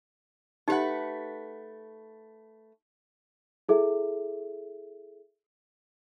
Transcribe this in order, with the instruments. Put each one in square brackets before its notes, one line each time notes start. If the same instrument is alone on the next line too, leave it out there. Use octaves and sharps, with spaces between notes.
[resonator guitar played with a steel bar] A3 B4 F#5 [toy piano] D#4 G4
[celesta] E4 G#4 A4 E5